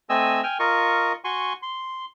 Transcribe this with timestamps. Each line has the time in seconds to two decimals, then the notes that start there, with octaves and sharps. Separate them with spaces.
0.10 A3 C4 D#5 G#5 E6
0.43 G5 G#5 F6
0.60 F4 A#4 D#5 C#6
1.24 F#4 G#5 C6 C#6
1.62 C6